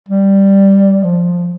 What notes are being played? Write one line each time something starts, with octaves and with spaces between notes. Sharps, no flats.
G3
F3